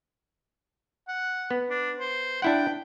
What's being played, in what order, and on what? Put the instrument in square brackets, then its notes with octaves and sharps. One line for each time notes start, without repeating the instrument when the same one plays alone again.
[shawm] F#5
[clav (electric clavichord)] B3
[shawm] D4
C5
[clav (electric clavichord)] D4 E4 F#5 [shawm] G5